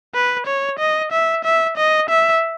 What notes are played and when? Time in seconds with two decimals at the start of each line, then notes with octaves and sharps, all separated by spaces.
0.14 B4
0.46 C#5
0.79 D#5
1.12 E5
1.44 E5
1.77 D#5
2.09 E5